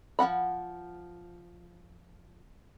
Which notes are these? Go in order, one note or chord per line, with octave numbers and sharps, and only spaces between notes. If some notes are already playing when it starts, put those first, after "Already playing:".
F3 E4 F#5 B5